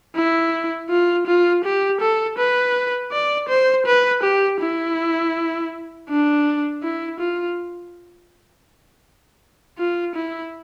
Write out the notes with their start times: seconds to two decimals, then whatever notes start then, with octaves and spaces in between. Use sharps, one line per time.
0.15 E4
0.90 F4
1.27 F4
1.64 G4
2.01 A4
2.38 B4
3.12 D5
3.49 C5
3.86 B4
4.23 G4
4.60 E4
6.09 D4
6.83 E4
7.20 F4
9.78 F4
10.15 E4